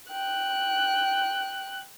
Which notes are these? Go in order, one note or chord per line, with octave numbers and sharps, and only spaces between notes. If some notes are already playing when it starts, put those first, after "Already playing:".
G5 F#6